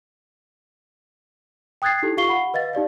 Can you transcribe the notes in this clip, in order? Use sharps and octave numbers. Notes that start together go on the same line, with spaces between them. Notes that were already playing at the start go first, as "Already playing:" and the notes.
G5 D#6 F#6 G#6 A6 C7
D#4 E4 G4 A4
F4 G4 F5 C#6 C7 G7
F#5 B5
B4 D#5 F5 A6
D#4 G4 D5 F5